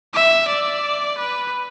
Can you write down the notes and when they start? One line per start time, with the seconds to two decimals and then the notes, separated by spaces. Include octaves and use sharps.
0.14 E5
0.48 D5
1.18 B4